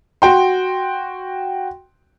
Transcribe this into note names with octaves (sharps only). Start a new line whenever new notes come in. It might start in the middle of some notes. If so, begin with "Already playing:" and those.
F#4 G5 C6